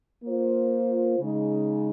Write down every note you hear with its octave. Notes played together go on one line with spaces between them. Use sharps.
A#3 F4 C5
C#3 G#3 D#4